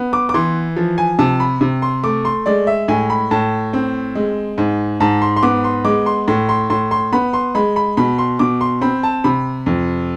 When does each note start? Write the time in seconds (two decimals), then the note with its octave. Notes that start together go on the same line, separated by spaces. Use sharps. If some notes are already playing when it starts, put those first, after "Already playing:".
Already playing: B3
0.13 D6
0.29 D6
0.34 E3 C6
0.76 F3
0.98 G#5
1.19 C3 A5
1.40 B5
1.61 C3
1.82 C6
2.03 A3 D6
2.25 C6
2.46 G#3 D5
2.67 E5
2.88 A2 G#5
3.10 B5
3.31 A2 A5
3.73 C4
4.15 G#3
4.58 G#2
5.00 G#2 A5
5.21 C6
5.36 C6
5.43 B3 D6
5.64 C6
5.85 G#3 D6
6.06 C6
6.28 A2 C6
6.49 C6
6.70 A2 C6
6.91 C6
7.13 B3 B5
7.33 C6
7.55 G#3 B5
7.76 B5
7.97 B2 B5
8.18 C6
8.39 B2 D6
8.61 C6
8.81 C4 B5
9.03 A5
9.24 C3 B5
9.66 F2